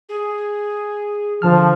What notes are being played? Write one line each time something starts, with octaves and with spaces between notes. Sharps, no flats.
G#4
D3 F3 A5 F6